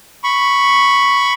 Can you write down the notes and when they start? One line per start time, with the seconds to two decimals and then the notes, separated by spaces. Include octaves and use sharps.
0.24 B5 C#6